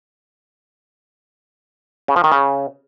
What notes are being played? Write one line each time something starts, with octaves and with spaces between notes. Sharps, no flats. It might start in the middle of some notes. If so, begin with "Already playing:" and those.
C#3
F3
D#3
C#3